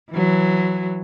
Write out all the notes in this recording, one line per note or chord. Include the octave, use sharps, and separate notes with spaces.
E3 F#3